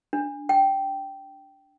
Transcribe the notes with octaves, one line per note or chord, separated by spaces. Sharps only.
D4
G5